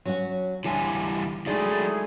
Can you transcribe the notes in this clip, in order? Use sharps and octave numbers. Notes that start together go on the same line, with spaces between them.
F#3 C#4 F#4
D2 E3 G3 G#5 A5
F#3 G#3 A3 D#4 E4 G#4 D5